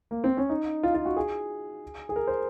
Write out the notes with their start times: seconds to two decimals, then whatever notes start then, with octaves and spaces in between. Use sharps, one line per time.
0.11 A#3
0.24 C4
0.37 C#4
0.49 D#4
0.83 F4
0.94 F4
1.05 F#4
1.17 G#4
2.09 G#4
2.16 A#4
2.27 C5